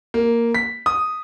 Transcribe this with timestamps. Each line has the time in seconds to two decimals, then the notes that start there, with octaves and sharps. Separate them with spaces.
0.14 A#3
0.55 B6
0.86 D#6